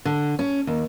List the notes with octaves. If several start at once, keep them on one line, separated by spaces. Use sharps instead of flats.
D3
C#4
D#2